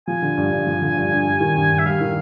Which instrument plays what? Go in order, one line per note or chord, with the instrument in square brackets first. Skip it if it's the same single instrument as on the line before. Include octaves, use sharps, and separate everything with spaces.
[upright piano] F3 [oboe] G#5
[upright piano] D3
G2
G2
F3
D3
G2
G2
G3
D#3
G2
G2
[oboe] E5
[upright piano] G3 [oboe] F5
[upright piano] D#3